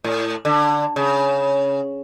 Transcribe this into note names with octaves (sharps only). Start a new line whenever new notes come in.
A2
D3
C#3